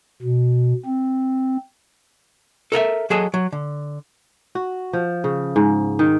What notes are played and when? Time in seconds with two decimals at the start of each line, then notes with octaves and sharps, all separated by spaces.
0.22 B2
0.85 C4
2.72 A4 A#4 D#5 E5
3.10 F#3 G#4 A4 D#5
3.34 F#3
3.52 D3
4.55 F#4
4.93 F3
5.24 C#3
5.56 G#2
5.99 D#3